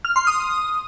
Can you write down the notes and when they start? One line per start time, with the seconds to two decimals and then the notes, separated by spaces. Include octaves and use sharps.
0.05 F6
0.16 C6
0.27 D#6